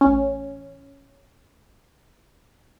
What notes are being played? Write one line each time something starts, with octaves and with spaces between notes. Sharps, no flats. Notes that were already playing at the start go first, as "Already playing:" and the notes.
A1 C#4